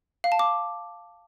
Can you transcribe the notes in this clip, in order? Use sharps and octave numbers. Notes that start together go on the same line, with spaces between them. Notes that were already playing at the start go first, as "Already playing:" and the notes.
F5
A5
D6